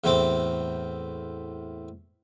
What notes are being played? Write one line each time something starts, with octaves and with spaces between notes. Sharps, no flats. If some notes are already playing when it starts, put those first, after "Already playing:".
E2 A2 A3 C4 C5 D6